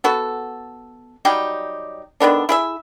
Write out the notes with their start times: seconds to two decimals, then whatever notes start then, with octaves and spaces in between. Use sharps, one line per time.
0.04 B3 F#4 A4
1.25 F#3 G3 D#4 G4
2.20 D3 D#3 B3 D4
2.49 E4 G#4 E5